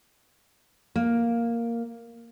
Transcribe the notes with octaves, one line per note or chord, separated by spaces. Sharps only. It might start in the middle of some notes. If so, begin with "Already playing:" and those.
A#3